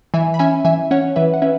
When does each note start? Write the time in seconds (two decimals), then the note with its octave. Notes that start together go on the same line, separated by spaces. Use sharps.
0.14 E3 E5 G#5
0.34 B5
0.39 C#4 E5 G#5
0.65 E3 E5 G#5
0.91 C#4 C#5 F#5
1.16 E3 B4 E5
1.34 F#5
1.42 C#4 B4 E5